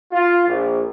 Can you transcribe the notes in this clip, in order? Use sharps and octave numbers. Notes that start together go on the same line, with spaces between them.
F4
A#1